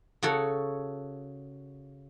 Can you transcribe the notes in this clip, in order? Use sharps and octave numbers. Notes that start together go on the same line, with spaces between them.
C#3 F#4 A4 C#5